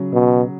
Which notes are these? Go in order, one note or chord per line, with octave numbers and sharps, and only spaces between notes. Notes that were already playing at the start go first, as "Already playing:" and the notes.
Already playing: C#3 F#3
B2